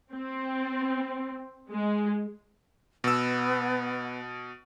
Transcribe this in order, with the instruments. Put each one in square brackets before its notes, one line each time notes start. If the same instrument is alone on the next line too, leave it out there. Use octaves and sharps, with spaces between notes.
[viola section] C4
G#3
[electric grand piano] B2 E6 [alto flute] B3